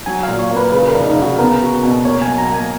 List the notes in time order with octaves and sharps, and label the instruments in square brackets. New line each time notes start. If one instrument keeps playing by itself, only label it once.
[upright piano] F#3 [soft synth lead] G#5
[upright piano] A#2 [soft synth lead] F5
[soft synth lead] C#5
[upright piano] A#3
[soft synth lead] B4
[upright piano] C#3 [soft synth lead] B4
[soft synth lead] A#4
[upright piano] F1
[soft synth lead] D#4
[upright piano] C#3
[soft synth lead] F#4
[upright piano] B3 [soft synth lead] A#4
[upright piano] F#4
B2
[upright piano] A#3 [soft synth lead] C#5
[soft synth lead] G#5
[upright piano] F#3
[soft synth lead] A#5
[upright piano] A#3
[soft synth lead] G#5